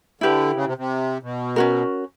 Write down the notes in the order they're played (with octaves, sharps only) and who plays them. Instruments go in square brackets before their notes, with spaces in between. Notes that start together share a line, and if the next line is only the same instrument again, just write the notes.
[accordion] D3 [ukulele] E4 G4 B4
[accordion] C#3
C3
C3
B2
[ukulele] C#4 F#4 A#4